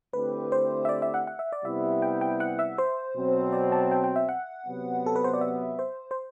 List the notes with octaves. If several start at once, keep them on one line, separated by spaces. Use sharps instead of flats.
D3 A3 C4 E4 G4 B4
C5
E5
D5
E5
F#5
F#5
E5
D5
C3 G3 B3 E4 E5
G5
G5
F#5
E5
C5
B2 F#3 C4
D5
A5
G5
G5
E5
F#5
C3 F#3 B3
A4
B4
C5
D5
E5
C5
C5